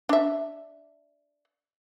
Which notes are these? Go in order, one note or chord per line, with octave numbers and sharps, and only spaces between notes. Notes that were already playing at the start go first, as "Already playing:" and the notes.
D4 E5